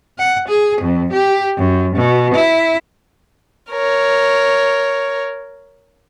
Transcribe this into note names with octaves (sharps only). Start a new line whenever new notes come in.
F#5
G#4
F2
G4
F#2
B2
E4
A#4 C#5